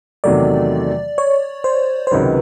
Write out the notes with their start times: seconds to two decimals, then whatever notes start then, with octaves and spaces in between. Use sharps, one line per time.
0.24 E2 C3 D#3 F#3 A3 D5
1.18 C#5
1.64 C5
2.07 C5
2.11 C#2 C3 D#3 F#3 B4